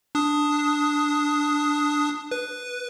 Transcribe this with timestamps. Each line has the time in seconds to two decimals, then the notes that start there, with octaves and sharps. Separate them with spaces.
0.15 D4 D#6
2.31 B4